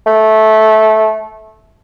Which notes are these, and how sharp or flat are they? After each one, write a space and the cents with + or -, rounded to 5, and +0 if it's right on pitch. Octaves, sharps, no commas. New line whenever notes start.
A3 -15